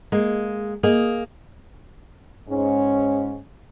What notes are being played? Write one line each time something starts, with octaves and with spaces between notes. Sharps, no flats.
G#3 A#3
A#3 G#4 D#5
G#2 C#4